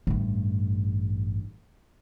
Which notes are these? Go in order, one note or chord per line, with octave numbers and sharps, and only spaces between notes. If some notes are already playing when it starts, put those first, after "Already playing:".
A1 G2